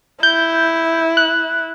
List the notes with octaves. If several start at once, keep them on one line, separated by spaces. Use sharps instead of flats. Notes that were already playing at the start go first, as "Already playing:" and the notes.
E4 G6
F#6